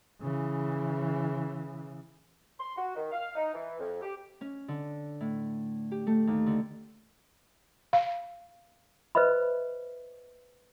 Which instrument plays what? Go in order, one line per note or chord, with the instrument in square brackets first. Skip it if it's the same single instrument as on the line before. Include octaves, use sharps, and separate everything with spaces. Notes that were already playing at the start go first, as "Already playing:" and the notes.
[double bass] C#3 E3
[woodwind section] C6
F#4
D#3
F5
D#4
E3
F2
G4
[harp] C#4
D3
A2
G4
A3
D#2
D3
[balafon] F5
[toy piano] B4 C5 D#5 E5 B5